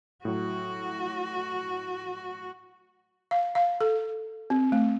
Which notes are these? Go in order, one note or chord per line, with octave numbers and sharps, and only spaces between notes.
A2 F#3 F#4
F5
F5
A4
C4
A3